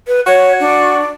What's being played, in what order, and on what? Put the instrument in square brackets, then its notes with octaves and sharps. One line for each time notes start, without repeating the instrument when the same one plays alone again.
[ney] B4
[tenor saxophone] F#4 [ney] C#5
[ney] D4